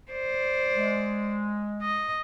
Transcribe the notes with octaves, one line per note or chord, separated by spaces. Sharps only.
C5 D5
G#3
D#5